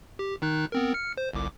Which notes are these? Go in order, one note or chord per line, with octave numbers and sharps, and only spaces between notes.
G4
D#3 D#4 F#6
B3 C4 A#4
F6 C#7
C5
G1 C2 D6